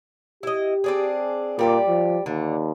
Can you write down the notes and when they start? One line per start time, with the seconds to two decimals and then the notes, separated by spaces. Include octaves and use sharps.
0.43 E4 G4 D#5
0.84 C4 D4 G#4
1.59 A#2 G3 G4 D5
1.88 F3
2.26 D#2 D3